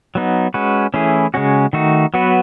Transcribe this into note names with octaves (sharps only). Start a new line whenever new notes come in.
F#3 B3 D#4
G#3 C#4 F#4 B4
E3 A3 C#4 E4 G#4
C#3 G#3 C#4 F#4
D#3 A3 D#4 F#4
F#3 B3 F#4 B4